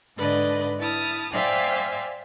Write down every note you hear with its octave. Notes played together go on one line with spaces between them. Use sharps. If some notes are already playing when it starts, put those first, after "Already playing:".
G#2 D3 B4 D5 D#5
E4 A5 D#6 F6
C5 D5 E5 F5 G5 G#5